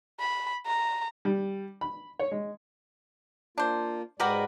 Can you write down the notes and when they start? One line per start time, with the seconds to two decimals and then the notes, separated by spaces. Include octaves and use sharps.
0.20 B5
0.66 A#5
1.25 G3
1.81 B5
2.19 C#5
2.31 G#3
3.58 A#3 D4 F4 C5
4.20 G#2 G#3 F#4 G4 A#4 B4 D5 F#5